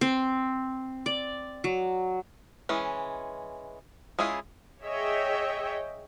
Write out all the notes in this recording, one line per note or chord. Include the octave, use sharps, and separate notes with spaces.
C4
D5
F#3
E3 G#3 C#4
G#3 C#4 E4 F4 G#4
G#4 C#5 D#5 E5 G5